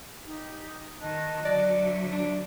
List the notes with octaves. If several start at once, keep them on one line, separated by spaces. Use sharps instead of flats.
D#4 G4
D#3 D#5 A5 F#6
D3 F#3 D5
E5
D4